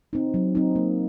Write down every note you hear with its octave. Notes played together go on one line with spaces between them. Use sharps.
C4 D#4
F#3
C4 D#4
A#3